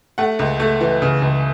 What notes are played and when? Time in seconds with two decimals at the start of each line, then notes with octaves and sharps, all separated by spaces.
0.18 A3 F#5
0.39 C#2
0.60 A3
0.81 E3
1.02 C#3
1.22 C#2